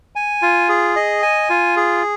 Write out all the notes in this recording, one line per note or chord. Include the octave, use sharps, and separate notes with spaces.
G#5
F4
G#4
D#5
G#5
F4
G#4